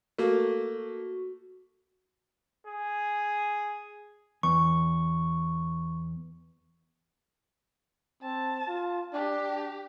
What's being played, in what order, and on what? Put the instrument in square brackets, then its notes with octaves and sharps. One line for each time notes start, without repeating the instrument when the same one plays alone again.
[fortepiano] A3 A#3 [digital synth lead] F#4
[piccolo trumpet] G#4
[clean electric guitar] E2 [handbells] C#6
[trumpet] C4 [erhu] A5
[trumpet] F4
[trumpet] D4 [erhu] G4